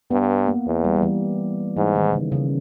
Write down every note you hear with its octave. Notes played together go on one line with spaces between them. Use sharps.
G2 B3
A#3
E2
G3
G3
E3
G#2 E3
D#3
C#3
C#3